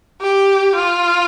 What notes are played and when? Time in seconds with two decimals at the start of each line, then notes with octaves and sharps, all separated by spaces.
0.21 G4
0.76 F4